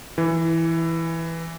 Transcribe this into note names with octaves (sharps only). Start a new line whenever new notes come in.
E3